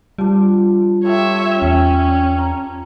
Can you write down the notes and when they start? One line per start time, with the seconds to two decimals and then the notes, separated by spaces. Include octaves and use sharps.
0.18 F3 G3 D4
1.04 A3 F4 G4 C#5 E5
1.62 E2 C#4 G5
2.39 A#5